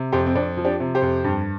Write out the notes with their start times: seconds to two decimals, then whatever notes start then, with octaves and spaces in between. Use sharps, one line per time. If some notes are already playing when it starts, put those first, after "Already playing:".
Already playing: C3
0.12 F2 G4 C5
0.26 C4
0.35 F2 D4
0.57 F3
0.65 D4 G4
0.80 C3
0.95 G4 C5
1.02 F2
1.24 G2